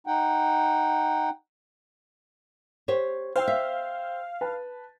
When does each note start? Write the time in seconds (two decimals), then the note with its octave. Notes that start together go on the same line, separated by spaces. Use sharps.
0.07 D#4 F#5 G5
2.88 G4 C5 C#5
3.36 C5 F5 G5 E6
3.48 E5
4.41 B4 A5